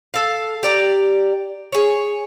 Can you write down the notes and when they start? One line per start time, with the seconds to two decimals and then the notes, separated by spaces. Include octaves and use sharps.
0.14 A4 F5
0.63 G4 D5 A#5
1.72 G#4 C#5